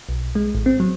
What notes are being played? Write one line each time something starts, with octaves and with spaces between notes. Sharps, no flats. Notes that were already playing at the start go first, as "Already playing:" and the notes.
B1
G#3
A1
C4
F#3